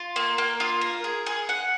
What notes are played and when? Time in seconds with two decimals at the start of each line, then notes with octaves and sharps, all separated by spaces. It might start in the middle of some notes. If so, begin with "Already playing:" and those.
Already playing: F4
0.16 A#3
0.38 A#3
0.60 F4
0.81 A#4
1.04 G#4
1.26 G#4
1.49 F#5